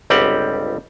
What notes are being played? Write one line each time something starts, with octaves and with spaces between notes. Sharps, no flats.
G1 C#2 G3 C4 G4 F#5